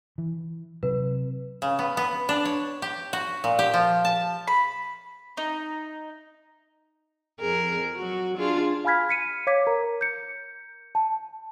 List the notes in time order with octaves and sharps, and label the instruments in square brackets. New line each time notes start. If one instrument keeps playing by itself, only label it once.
[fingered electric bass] E3
[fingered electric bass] C3 F#3 [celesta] B4
[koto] C#3
B3
B3
D4
C#5
G4
F#4
A#2
G4
F3
A5
[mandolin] B5
D#4
[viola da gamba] F2 G#4 A#4
F#3 F#4
D4 F4 G#4
[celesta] F5 G#5 B5 F6 G#6 B6
B6 C#7 D#7
C#5 F5 D6 G#6 B6
A#4 A#5
G6 C#7
A5